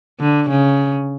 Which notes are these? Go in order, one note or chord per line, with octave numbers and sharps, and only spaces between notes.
D3
C#3